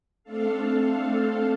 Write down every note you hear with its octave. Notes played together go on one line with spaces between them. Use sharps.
A3 C4 D4 A4 F5